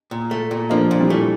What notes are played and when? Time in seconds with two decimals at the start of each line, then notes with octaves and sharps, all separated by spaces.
0.11 A#2
0.31 A3
0.51 A#2
0.70 F3 A#3 D4
0.91 A#2
1.00 E3 G3
1.10 A3